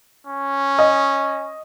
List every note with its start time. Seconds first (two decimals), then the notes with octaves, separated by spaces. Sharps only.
0.27 C#4
0.79 D#5